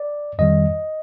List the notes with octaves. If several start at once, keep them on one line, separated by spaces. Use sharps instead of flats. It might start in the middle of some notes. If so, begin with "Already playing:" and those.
Already playing: D5
F2 D#3 G3 D#5